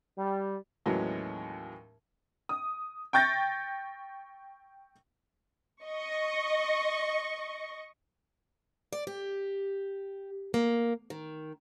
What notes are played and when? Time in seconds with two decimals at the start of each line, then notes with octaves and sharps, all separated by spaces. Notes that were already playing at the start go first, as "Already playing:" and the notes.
0.18 G3
0.86 D#2 A2 E3 F#3 G#3 C#4
2.49 D#6
3.13 G5 C#6 G6 A6 A#6
5.84 D#5 C#6
8.93 D5
9.07 G4
10.54 A#3
11.10 D#3